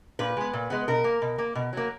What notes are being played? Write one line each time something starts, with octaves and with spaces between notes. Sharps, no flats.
A#2 B4
G#3 B3
A#2
G#3 B3
B2 A#4
A#3
B2
A#3
B2
F#3 A#3